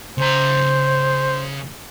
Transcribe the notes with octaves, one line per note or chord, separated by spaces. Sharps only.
C#3 C5 A#5